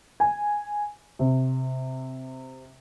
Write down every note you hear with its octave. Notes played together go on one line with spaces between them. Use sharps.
G#5
C3